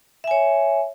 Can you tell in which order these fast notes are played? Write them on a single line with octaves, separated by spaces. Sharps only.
E5 G#5 C#5